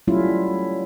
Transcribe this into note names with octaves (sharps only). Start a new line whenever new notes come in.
F#3 G3 A3 C#4 E4 F4